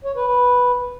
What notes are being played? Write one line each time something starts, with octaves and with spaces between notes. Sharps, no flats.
C#5
B4
B4